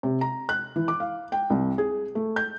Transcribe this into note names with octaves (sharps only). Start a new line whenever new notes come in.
C3
A#5
F#6
E3
D6
F5
G5
C2
G#4
A3
G6